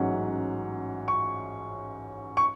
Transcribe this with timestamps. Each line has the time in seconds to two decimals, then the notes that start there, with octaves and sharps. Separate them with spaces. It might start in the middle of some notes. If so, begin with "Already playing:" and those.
Already playing: A1 G#2 F#3 C#4 F#5
1.08 C#6
2.37 C#6